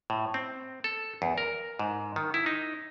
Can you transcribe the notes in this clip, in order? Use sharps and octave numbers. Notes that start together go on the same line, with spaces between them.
A2
C4
A4
E2
A#4
G#2
D#3
E4
D#4